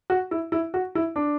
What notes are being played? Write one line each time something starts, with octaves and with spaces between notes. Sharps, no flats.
F#4
E4
E4
F#4
E4
D4